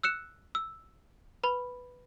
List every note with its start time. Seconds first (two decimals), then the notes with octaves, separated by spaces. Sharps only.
0.03 E6 F#6 C#7 E7
0.55 E6
1.44 B4 B5